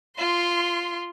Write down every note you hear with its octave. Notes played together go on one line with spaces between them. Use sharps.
F4 C6